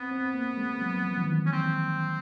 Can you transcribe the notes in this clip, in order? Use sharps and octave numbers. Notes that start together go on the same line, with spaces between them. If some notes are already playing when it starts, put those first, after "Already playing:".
Already playing: B3 C4
C4
A#3
G#3
F#3
F3
D#3
E3
C#4
C4